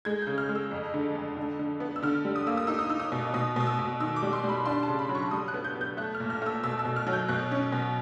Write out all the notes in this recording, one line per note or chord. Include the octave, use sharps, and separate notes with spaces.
G#3 G#6
C#3 G6
F6
G#3
E6
F2
D3
F2
D3
D3
B3
E6
D3 F6
G3
D#6
A#3 E6
D#6
D#4 E6
D#6
D#4 E6
D#6
B2
B2 D#6
B2 D#6
E6
B2
D#3 E6
D6
G3
C6
G3
B5
D4 C6
A5
C#3
B5
F#3
C#6
G3 D#6
F#6
B3
G6
B3
G6
A3 F#6
F6
A#2
F6
A3 E6
B2 E6
E6
B2
F6
F#3
G6
B2 F#6
C#4
B2